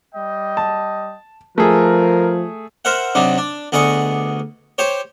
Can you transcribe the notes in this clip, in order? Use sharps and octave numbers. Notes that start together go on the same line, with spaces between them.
G3 D#5 G5
A5
F3 A3 G#4 A#4
A#4 C5 E5 F#5
C3 F#3 D4 D#4
D4
D2 B3 G#4 D5 D#5 C#6
G4 C5 C#5